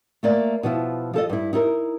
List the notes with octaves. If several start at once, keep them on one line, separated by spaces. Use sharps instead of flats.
A3 A#3 D5
B2 F3 E4
F3 A4 D#5
G2 E4
D#4 E4 A4 A#4